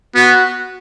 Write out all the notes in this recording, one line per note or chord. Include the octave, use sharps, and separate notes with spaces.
B3 F#4